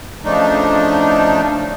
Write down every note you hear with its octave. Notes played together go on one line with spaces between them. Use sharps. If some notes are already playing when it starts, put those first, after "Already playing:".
C#3 F3 A3 D4 D#4